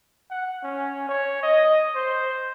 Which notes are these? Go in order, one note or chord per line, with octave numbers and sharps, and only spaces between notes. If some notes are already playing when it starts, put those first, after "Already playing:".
F#5
C#4
C#5
D#5
C5